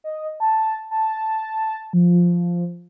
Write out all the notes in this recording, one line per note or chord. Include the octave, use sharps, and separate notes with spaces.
D#5
A5
A5
F3